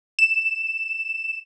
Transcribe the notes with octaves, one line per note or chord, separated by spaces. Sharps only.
E7